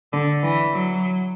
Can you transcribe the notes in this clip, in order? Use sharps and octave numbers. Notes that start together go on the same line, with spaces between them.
D3
E3
F#3